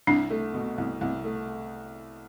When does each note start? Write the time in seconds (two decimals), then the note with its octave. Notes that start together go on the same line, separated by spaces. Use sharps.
0.07 C2 D4
0.31 A3
0.54 B2
0.78 C2
1.01 C2
1.24 A3